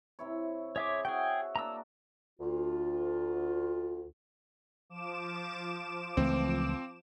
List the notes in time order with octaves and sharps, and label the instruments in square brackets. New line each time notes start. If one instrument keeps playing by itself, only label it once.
[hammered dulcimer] C3 E4 C#5
[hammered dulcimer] G#4 C6 [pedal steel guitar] C#5 E5 D6
[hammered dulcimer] F#4 C#5 E5 [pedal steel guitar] G#4 G5
[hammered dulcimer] A#3 D4 [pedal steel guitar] A#5 E6
[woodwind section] D2 F4
[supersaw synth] F3 D6 E7
[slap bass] C#2 E3 A3 [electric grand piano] C4